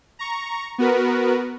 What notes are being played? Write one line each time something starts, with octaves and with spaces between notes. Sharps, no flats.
A#5 C#6
B3 F#4 A#4 B4